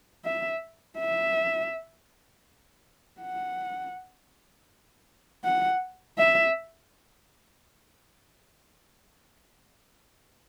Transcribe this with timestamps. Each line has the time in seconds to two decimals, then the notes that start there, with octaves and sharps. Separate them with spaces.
0.25 E5
0.99 E5
3.21 F#5
5.44 F#5
6.18 E5